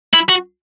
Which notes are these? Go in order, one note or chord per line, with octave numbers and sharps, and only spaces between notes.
E4
F#4